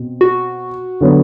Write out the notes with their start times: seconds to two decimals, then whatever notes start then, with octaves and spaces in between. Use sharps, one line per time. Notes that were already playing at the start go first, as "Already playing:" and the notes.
Already playing: B2 C4
0.21 F#4
1.01 D3 F#3 B3